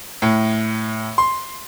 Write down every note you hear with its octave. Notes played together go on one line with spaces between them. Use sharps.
A2
C6